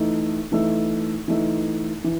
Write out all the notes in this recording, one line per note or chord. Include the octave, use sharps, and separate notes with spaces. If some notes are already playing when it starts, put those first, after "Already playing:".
Already playing: E3 A3 D#4
E3 A3 D#4
E3 A3 D#4
E3